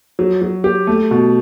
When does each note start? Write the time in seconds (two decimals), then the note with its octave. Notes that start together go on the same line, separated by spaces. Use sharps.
0.19 F#3
0.42 F#3
0.64 G4
0.87 A3
1.11 B2